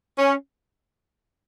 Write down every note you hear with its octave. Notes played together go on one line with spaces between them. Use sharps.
C#4